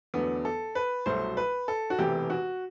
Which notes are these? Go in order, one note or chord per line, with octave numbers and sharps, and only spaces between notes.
E2 D3 F#3 A3 B3
A4
B4
C2 B2 F#3 A3 C5
B4
A4
F#4
E1 E2 C3 E3 A3 G4
F#4